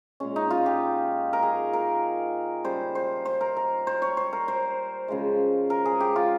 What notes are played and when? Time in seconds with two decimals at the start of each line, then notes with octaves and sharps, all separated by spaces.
0.20 A#2 G#3 C#4
0.36 D#4
0.51 F4
0.66 G4
1.33 A#4
1.43 G#4
1.73 A#4
2.64 C#3 G3 C5
2.95 C5
3.25 C5
3.41 A#4
3.57 A#4
3.87 C5
4.02 C#5
4.17 C5
4.33 A#4
4.48 C5
5.08 C#3 F3 G#3
5.70 A#4
5.85 G#4
6.00 G4
6.16 F4